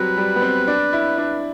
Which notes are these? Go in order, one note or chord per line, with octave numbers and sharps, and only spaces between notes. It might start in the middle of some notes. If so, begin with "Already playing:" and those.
Already playing: F#3 G3 C4 B4
G3
B3
C4
D4
E4
D4